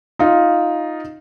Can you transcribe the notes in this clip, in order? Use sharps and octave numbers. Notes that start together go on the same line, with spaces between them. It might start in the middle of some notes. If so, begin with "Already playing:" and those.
D#4 F4